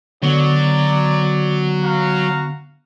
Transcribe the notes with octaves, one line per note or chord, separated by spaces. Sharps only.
D3 F#3 B3 D5
F#4 F5 A#5